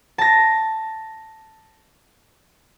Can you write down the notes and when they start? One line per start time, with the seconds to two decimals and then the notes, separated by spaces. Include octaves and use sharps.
0.18 A5 A#6